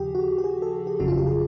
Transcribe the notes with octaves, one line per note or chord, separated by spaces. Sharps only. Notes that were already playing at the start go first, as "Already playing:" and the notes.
Already playing: D#2 C#3 F3 G4 G#4
F#4
G4
G#4
A4
G4
G1 F2 C#3 F#3 F#4
F4
G4
G#4